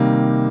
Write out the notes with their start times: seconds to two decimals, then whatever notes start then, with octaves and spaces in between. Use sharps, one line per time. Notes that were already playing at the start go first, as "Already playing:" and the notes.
Already playing: C3 D#3 G3 A#3